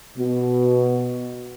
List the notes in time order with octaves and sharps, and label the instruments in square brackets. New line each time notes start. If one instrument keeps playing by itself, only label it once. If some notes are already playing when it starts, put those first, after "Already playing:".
[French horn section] B2